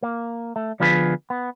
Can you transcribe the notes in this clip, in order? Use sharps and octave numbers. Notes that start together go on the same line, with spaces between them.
A#3
A3
D3 F3 B3 F4 G#4 B4
B3